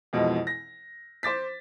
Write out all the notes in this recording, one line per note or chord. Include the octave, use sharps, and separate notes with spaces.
F2 B2 E3 G#3
A#6
C5 D6 A6 B6